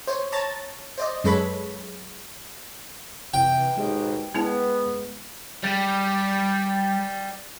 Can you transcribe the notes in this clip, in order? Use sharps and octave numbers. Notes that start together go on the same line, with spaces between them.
C5 C#5
C#5 A5 A#5 A6
C5 D5 D#5
F#2 G#3 A4 B4 C#5 B5
C3 E3 G5
D#2 G#2 B2 G#3 G4 C5
G#3 B3 D4 E4 A5
G3 D5 G5